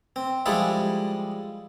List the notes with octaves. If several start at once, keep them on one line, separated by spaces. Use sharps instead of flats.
C4
F3 G3 G#3 E4 A4